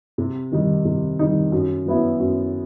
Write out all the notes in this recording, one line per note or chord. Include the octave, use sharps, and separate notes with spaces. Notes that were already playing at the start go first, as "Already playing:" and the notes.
C3
D#3 G3 D#4
C3
D#3 G3 D#4
F#2
F#3 B3 E4
F#2